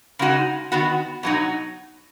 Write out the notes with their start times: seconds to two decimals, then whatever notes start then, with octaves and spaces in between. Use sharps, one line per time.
0.19 C#3 G#3 D#4 F#4
0.72 D#3 B3 F#4
1.23 B2 F#3 D#4 F#4